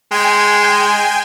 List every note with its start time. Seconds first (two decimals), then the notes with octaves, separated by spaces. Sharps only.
0.11 G#3 G5 G#5